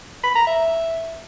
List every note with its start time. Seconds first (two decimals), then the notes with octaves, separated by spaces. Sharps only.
0.24 B5
0.35 A#5
0.47 E5